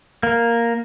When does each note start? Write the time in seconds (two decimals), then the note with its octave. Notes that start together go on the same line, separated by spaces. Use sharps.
0.23 A#3